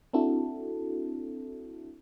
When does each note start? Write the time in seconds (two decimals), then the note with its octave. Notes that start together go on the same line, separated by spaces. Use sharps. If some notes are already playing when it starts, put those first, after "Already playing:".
0.13 C4 D4 E4 F#4 A4